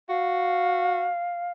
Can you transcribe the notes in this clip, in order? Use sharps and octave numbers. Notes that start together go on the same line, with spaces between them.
F#4 F5